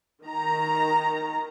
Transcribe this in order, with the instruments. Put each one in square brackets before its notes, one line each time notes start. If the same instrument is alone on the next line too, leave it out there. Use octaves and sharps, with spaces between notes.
[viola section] D#3 A#5